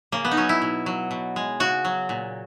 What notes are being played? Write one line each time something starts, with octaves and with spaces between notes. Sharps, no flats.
C#3 A#3
B3
D#4
F#3 C#4
E4
B2
F#3
B2
G#3
C#3 F#4
F#3
A#2